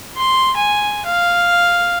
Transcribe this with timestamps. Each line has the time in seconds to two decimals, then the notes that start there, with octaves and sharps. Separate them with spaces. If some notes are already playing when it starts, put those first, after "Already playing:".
0.17 C6
0.56 G#5
1.05 F5